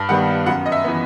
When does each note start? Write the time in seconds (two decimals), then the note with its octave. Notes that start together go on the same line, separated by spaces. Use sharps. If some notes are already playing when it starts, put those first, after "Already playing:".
Already playing: G2 A5 B5
0.09 D#3 G3 B3 F#5
0.46 F#2 F#5
0.66 D#5
0.72 E5
0.84 E3 B3